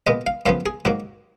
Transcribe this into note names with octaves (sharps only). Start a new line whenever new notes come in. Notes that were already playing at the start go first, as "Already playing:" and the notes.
A#2 G#3 B3 D#5
F5
F#2 C#3 F3 B3 F5
G#4
G#2 F#3 A#3 F#4